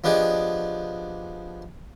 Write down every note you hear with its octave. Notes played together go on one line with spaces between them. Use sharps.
F3 B3 D4 G4 G#4 D#5